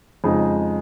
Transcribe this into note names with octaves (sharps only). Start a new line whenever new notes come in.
F2 C#3 G#3 D#4